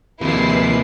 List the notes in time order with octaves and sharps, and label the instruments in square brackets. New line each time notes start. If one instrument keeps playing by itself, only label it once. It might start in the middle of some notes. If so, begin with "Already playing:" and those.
[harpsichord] A#1 D#2 [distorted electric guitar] C3 A#3 [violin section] E4 B4 C7